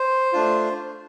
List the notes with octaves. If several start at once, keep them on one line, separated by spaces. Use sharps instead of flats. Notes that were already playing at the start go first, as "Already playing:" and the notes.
Already playing: C5
A3 D4 F4